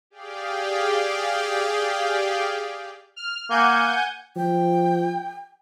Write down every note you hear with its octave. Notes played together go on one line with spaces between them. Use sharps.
G4 G#4 D5 F5 G5
F6
A#3 F#5 G#5 G6
F3 G5